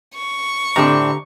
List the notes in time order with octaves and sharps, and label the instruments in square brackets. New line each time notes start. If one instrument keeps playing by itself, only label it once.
[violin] C#6
[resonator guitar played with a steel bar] A2 C4 D4 [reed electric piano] D3 G4 A#5